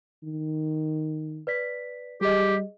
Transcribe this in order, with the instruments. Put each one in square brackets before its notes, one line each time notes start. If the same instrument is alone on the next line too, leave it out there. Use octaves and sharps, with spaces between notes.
[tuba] D#3
[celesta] B4 D5 B6
[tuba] G3 [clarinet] G4 [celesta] G#4 D#5